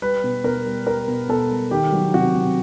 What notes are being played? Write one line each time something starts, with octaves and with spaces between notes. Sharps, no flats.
G3 B4
B2
B2 A#4
G3
G3 A#4
B2
B2 A4
G3
D#3 G4
F#3
C3 F#4
C3